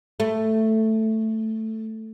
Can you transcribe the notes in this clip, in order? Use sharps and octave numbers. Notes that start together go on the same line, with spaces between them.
A3